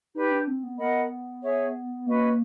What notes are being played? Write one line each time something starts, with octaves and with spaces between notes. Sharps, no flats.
D#4 G4 B4 D5 G5
D4
C4
B3
B3 A#4 D#5 F#5 B5
G#4 C#5 E5
A#3 C#4 F#4 B4 D#5